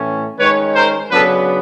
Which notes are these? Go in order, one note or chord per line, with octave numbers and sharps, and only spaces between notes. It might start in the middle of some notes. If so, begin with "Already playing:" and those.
Already playing: A2 E3 A3 C#4
D#3 G#3 C#4 B4 C#5
A#4 C5
C#3 F#3 B3 D4 A4 B4